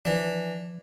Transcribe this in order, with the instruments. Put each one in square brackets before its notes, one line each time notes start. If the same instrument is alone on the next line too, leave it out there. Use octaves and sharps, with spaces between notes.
[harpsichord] E3 D4 [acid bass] F3